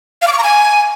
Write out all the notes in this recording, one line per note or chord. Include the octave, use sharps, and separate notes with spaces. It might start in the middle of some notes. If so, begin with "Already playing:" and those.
F5
D6
C#6
A#5
G#5